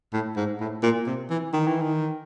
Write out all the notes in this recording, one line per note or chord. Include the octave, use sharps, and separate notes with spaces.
A2
G#2
A2
A#2
C3
E3
D#3
E3
D#3